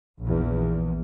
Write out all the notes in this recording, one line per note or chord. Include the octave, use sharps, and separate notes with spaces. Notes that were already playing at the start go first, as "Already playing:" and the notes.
A#1 E2